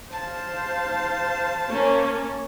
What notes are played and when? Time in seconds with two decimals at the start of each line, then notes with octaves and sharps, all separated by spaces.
0.12 C5 F5 A5
1.70 A#3 C#4